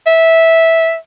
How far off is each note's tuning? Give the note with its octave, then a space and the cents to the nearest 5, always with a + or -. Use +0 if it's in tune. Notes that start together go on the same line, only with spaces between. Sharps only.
E5 -10